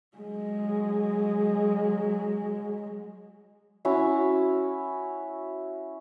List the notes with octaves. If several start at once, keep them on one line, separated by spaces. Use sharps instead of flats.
F#3 G#3
C#4 E4 F#4